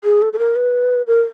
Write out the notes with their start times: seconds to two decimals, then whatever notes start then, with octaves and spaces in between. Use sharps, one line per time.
0.04 G#4
0.22 A4
0.33 A4
0.39 A#4
0.56 B4
1.07 A#4